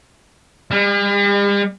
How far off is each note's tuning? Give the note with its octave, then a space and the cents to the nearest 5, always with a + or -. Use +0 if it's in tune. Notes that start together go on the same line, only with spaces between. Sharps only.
G3 +45